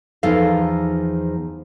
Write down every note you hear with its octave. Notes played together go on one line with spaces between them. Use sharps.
E2 F3 D#4 A4 F5